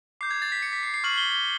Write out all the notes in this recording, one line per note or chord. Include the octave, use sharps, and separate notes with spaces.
D6 G6 C7
G#6
A6
B6
C#7
B6
C7
C7
C#6 F6 F#7
G7
G7